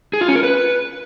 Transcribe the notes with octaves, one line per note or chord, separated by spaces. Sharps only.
G#4
F4
C#4
A#4
B4